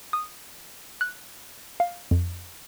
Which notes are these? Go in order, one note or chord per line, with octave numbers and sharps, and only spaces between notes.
D#6
F#6
F5
F2